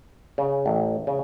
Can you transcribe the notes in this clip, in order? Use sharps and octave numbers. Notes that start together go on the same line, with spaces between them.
C#3
A1
C#3